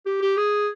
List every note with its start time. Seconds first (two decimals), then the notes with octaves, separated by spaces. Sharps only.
0.06 G4
0.21 G4
0.37 G#4